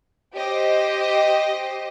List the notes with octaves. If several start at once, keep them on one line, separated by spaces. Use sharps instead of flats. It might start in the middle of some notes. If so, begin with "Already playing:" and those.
G4 C5 D#5